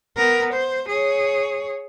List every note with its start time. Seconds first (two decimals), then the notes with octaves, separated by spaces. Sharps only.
0.16 B3 A#4
0.53 C5
0.89 G#4 C#5